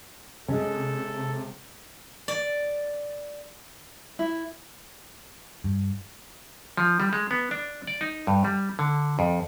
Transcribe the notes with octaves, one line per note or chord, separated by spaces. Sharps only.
C3 G#3 C#4 A4
D5
E4
G2
F3
G3
G#3
B3
D4
D5
D#4
G2
G3
D3
F2